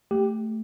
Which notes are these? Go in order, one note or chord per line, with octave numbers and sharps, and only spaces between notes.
A3 G4